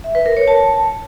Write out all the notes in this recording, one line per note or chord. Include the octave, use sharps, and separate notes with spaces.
E5
B4
A#4
C#5
A5